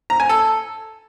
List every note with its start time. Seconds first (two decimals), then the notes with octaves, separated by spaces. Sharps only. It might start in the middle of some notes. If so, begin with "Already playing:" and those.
0.10 A#5
0.20 G#5
0.29 A4